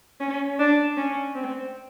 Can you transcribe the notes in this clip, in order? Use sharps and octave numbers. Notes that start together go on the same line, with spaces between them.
C#4
D4
C#4
C4